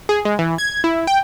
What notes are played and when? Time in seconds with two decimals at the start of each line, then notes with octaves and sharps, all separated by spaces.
0.09 G#4
0.25 G#3
0.39 E3
0.58 G#6
0.84 E4
1.07 G5